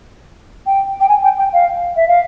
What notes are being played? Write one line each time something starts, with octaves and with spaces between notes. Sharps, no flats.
G5
G5
G#5
G5
G5
F5
E5
F5